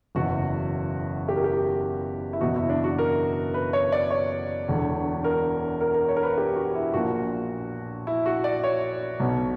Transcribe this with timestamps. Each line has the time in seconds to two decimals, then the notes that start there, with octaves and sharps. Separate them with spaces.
0.15 F#1 E2 B2 F#4
1.28 G4
1.36 A#4
1.44 G4
2.33 E4
2.41 F#1 E2 B2 F#4
2.56 E4
2.69 D4
2.84 F#4
2.99 A#4
3.54 B4
3.73 C#5
3.92 D5
4.10 C#5
4.68 E1 E2 D3
5.24 A#4
5.81 A#4
5.94 A#4
6.08 C#5
6.16 A#4
6.23 B4
6.38 G4
6.56 F#4
6.75 E4
6.94 A#1 A#2 F#4
8.07 E4
8.26 F#4
8.44 D5
8.64 C#5
9.20 B1 B2